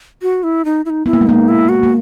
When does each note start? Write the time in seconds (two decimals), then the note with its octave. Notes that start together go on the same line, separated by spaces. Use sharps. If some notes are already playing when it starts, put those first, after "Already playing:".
0.22 F#4
0.43 E4
0.65 D#4
0.85 E4
0.90 D#4
1.06 B3 E4
1.13 A#3
1.21 G#3
1.27 A#3 D#4
1.48 E4
1.69 F#4
1.83 A#3